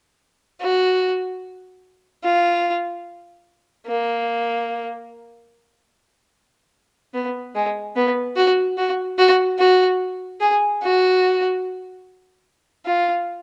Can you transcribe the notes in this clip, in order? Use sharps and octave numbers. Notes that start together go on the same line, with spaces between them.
F#4
F4
A#3
B3
G#3
B3
F#4
F#4
F#4
F#4
G#4
F#4
F4